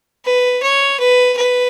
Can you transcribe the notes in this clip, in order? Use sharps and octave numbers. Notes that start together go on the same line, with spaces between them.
B4
C#5
B4
B4